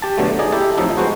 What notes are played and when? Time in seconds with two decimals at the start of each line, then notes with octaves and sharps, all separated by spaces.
0.02 G4 A5
0.17 B2 D3 F#3 A3
0.39 D#4 G#4 D5 D#5
0.52 E4 G4 A4
0.77 F2 A2 F3 F#3 D#4 A4
0.97 G#3 B3 F#4 C5